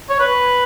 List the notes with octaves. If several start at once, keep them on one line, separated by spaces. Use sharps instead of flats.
C#5
B4